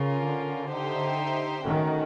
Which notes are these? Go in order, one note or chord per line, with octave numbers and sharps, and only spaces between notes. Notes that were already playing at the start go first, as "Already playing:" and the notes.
Already playing: C#3 C#4 F4 A#4
D3
D#4 G4 C5 E5 G5
D#3 A3 C#4 F#4